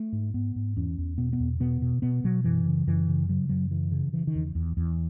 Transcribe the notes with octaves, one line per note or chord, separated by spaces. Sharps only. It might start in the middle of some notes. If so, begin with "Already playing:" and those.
Already playing: A3
G#2
G#2 B3
G#2
E2 C#4
E2
B2 B3
B3
E2
B2 B3
B2
B2 B3
B2 F#3
F#2 E3
C#3
F#2 E3
C#3
C#3 F#3
F#2 F#3
C#3 E3
C#3
C#3 E3
D#3
E2
E2
E2